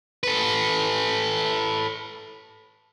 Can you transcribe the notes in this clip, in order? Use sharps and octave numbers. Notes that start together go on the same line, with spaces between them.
A4 B4